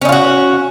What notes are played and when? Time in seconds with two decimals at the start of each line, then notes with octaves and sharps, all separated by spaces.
0.02 C#4
0.05 D#4
0.09 F4
0.12 F#4